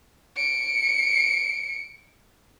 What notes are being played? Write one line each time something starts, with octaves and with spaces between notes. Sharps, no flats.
C#7 D7